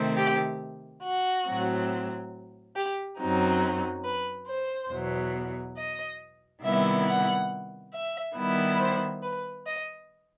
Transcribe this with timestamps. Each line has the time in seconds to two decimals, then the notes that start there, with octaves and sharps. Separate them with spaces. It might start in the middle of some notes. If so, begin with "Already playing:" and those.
Already playing: C3 D#3 A3 C4
0.16 G4
1.03 F#4
1.46 A2 F#3 C4
2.75 G4
3.19 F#2 F#3 C4 D#4
4.04 B4
4.48 C5
4.91 E2 B2 F#3
5.77 D#5
6.63 C3 D#3 G3 B3 E4 E5
7.07 F#5
7.93 E5
8.35 D#3 G3 B3 E4
8.79 C5
9.22 B4
9.65 D#5